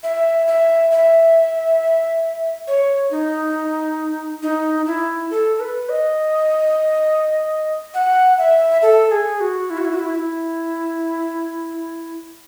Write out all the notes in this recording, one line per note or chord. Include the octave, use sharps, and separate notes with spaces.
E5
E5
E5
C#5
D#4
D#4
E4
A4
B4
D#5
F#5
E5
A4
G#4
F#4
E4
F#4
E4
F#4
E4
E4